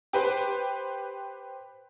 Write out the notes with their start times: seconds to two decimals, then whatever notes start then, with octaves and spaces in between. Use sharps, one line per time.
0.13 G4 B4 C5